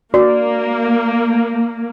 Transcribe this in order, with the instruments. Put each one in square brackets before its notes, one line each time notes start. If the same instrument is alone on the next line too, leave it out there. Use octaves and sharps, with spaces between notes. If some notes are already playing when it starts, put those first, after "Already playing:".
[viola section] A#3 [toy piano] F#4 [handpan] D5